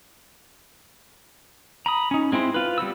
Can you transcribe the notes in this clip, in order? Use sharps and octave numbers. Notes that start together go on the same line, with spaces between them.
A#5 B5 D#6
C#4 D#4
G#3 C4 E4 C5
F4 B4
G3 B3 C4 E6